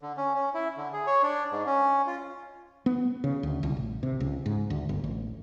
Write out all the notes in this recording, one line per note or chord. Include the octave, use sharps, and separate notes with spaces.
D3
C#4
C#4
E4
D3
G#4
C#5
D4
G#2
C#4
F4
B3
C#3
D2
C2
A1
C3
C#2
G#2
D2
G1
A1